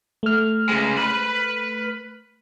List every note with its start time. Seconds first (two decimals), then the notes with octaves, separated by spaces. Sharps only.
0.23 A3 F6
0.69 C#3 G#3
0.97 B4 B5